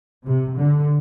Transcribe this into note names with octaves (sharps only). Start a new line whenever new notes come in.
C3
D3